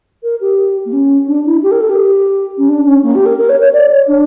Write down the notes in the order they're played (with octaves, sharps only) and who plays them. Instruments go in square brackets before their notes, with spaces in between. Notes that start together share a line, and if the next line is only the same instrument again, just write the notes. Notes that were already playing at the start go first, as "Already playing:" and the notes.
[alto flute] A#4
G4
A#3
C#4
D4
E4
G4
A#4
A4
G4
C#4
D4
C#4
A#3
G4
A#4
A#4
C#5
C#5
D5
C#5
D4